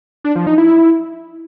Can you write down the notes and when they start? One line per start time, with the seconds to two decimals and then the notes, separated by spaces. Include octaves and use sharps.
0.25 D4
0.36 F3
0.47 D#4
0.58 E4